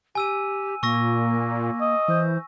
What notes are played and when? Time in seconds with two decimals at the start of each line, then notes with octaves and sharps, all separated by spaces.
0.15 G4 G#5 E6 D#7
0.83 A#2 A#3 C#6 E6 A#6
1.81 D#5
2.08 E3 C5